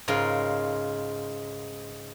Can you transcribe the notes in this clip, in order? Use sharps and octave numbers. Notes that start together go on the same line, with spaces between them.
G#2 C#3 F4 A#4